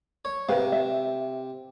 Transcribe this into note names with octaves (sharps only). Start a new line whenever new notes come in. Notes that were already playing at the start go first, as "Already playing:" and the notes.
C#5
C3 A#4 B4 F5
E5